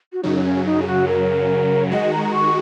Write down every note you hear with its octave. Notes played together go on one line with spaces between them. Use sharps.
F#4
F#2 C#3 F#3 D#4
C#4
D#4
G#4
F#4
A#4
D#3 G#3 F#4 D#5
A#5
A#5
C#6